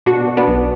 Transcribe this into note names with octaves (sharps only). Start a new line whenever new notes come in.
B2 D4 F#4
B2
B3 D4
B1